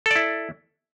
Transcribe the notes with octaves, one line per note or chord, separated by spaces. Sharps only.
E4 A4 D5